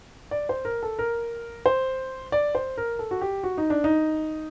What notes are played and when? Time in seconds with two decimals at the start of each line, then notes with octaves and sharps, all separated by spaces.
0.31 D5
0.49 C5
0.65 A#4
0.83 A4
0.99 A#4
1.66 C5
2.32 D5
2.55 C5
2.78 A#4
2.99 A4
3.11 F#4
3.21 G4
3.43 F#4
3.58 D#4
3.70 D4
3.84 D#4